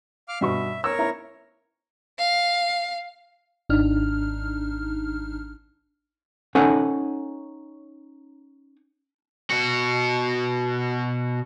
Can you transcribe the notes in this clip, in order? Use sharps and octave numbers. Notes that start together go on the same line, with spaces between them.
F5 D6 F6
G2 B2 E5 C#6
A#4 C#5 E6
E4 E5 A#5
F5
G#1 D4 D#4 F6
C#4 D#4 A4 F#5 G#5
B2 F#4